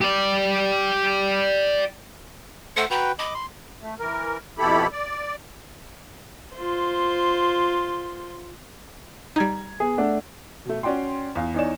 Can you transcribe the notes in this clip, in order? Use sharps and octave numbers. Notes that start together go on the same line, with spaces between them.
G4 D5
A3 A4 C5 F#5
F#4 B4 G5 A#5
D#5 B5 D6
C6
A3
E3 A#4
F2 B2 E4 G4 A4 B5
D5
F4 C5
G3 D#4 A#5 G#6
B3 G#4
A3 D4 F#5
B2 A3
C#4 F#4 D5 G5 C6
E2 F5
E2 D#4 C#5 D5 E7